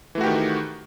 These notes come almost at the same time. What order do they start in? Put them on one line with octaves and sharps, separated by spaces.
E3 A3 F#4 G4 D#3